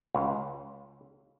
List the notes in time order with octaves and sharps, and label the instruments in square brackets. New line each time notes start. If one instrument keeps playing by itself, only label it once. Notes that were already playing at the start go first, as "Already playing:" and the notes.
[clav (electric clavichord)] C#2